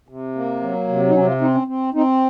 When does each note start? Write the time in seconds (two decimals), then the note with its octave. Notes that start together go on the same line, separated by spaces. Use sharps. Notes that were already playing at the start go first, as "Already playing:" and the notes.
0.09 C3
0.35 A#3
0.62 F#3
0.88 C3
1.09 D#4
1.15 C3 C#4
1.28 F4
1.41 C4 D#4
1.54 C#4
1.67 C4
1.94 C4 D#4